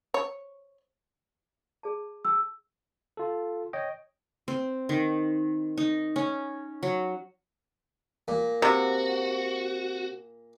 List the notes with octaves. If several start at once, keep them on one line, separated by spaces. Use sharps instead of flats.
C#5
G#4 D5 A5
G5 A5 E6
F4 A4
C#5 D#5 G5
C4
D#3
D#4
C#4
F#3
A#2
C3 F#4